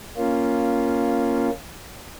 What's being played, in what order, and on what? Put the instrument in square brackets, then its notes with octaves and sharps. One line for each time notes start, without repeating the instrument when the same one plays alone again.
[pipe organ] A#3 C#4 F4